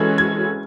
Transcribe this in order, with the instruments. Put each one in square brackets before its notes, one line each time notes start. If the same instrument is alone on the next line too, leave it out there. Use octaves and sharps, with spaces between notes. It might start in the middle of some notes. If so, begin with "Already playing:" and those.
Already playing: [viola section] E3 G#3 C#4 F#4 A4 [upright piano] G#6
[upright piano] G#6